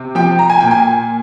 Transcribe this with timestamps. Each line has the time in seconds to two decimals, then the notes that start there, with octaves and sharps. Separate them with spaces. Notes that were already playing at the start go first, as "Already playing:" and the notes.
Already playing: C3
0.15 F3 G5
0.39 A#5
0.50 G#5
0.60 A#2 G5
0.71 G#5